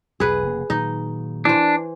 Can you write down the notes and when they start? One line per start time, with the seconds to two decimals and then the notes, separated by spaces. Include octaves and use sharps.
0.20 B1 E2 B2 G#4 B4
0.43 F1 C#3 A#3
0.70 A#2 D#3 F#3 D#4
1.45 E3 D4 C5